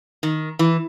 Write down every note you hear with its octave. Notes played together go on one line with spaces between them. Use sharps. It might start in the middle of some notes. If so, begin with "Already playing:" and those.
D#3
E3